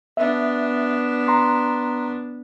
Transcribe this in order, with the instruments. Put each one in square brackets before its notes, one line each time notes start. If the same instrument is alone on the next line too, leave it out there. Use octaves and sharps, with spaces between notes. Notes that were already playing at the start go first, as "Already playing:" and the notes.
[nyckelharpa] B3 D4 [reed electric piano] E5
[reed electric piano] A#5 C6